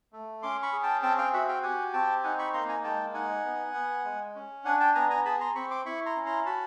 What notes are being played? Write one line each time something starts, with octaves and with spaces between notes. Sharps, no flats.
A3
C#4 C6 D6
B5 C#6
G#4
G5 A5
C4 G5 A5
F5 G5
F#4 E5 F#5
F5 G5
G4 F#5 G#5
C4 G5 A5
D#4 F#5 G#5
B5 C#6
A#3 A#5 C6
G#5 A#5
G#3 G5 A5
D#4 F#5 G#5
B3
B3
G#3
C#4
D4 F#5 G#5
G5 A5
B3 G#5 A#5
G#5 A#5
G#4 A5 B5
A#5 C6
C4 B5 C#6
C6 D6
E4 B5 C#6
A#5 C6
C#4
A#5 C6
F#4 A5 B5